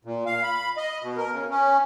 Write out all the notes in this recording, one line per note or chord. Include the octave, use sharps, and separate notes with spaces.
A#2
F5
B5
D#5
B2
A#4
C#3
C#4